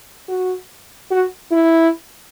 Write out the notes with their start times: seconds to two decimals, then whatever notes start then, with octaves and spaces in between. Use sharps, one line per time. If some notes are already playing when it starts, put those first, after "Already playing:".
0.29 F#4
1.11 F#4
1.52 E4